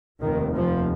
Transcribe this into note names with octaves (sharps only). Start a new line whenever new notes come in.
F1 D#2 D#3
F3